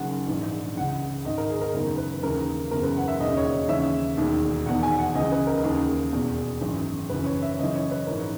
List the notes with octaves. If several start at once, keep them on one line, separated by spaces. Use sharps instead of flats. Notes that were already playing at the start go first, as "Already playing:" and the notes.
Already playing: F#1 F#2 D#3 F#5
A#1 G#2 E3
C#2 C#3 E3 F#5
G#1 G#2 D#3 D#5
A#4
G#4
A#4
F#1 E2 D#3 A#4
B4
D#2 C#3 E3 A#4
F#1 E2 C#3 E3 A#4
B4
F#5
E5
E1 D#2 C#3 D#5
C#5
D#2 C#3 E3 E5
E1 D#2 D#3
E1 E2 D#3 F#5
G#5
F#5
C#2 C#3 E3 D#5
B4
A#4
D#2 C#3 E3 G#4
E1 E2 B2
G#1 F#2 E3
F#1 F#2 E3 B4
C#5
E5
F#1 F#2 E3 D#5
C#5
B4
A#1 G#2 E3 A#4